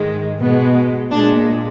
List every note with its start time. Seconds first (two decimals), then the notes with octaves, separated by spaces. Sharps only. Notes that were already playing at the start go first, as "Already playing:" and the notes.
Already playing: G#2 D#3 G#3
0.40 B2 G#3 B3
1.11 A#2 G#3 D4